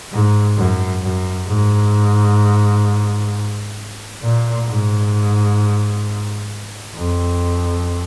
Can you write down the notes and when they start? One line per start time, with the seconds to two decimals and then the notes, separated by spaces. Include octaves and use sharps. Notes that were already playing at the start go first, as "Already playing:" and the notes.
0.12 G#2
0.57 F#2
1.03 F#2
1.48 G#2
4.22 A#2
4.67 G#2
6.95 F2